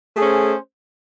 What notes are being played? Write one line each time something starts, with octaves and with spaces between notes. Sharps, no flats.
A3 C#4 G#4 C5